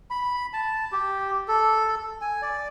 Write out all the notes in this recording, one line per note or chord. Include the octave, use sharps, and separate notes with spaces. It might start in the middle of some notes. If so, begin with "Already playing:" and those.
B5
A5
G4
A4
G#5
D5